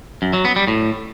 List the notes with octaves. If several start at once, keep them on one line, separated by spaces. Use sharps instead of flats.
F#2
F#3
B3
G3
A2